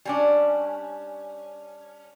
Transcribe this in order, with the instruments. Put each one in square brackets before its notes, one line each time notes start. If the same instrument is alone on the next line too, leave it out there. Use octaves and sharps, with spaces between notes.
[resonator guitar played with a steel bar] G3 C#4 D4